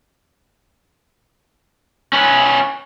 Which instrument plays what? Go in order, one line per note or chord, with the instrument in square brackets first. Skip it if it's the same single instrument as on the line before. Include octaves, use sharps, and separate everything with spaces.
[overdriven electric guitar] C#4 B4